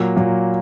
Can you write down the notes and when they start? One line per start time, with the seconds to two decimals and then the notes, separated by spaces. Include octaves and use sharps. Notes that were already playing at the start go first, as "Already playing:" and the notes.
Already playing: A#2 F#3 A#3
0.16 A#2 F#3 A#3